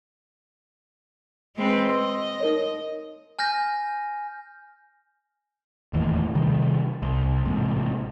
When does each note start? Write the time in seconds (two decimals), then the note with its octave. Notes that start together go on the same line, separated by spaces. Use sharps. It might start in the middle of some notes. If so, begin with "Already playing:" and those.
1.57 G#3 C4 B4
1.89 D#5 C6 E6
2.40 D#4 A#4 C#5
3.39 G#5 F6 G6 A#6
5.93 E1 D#2 A2 E3
6.35 C3 D#3 G3
7.02 C2
7.46 A1 G#2 C3